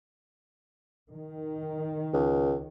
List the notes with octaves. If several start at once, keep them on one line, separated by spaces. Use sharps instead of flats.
D#3
C#2